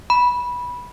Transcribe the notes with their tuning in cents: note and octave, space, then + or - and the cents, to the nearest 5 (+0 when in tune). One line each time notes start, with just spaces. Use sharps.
B5 -15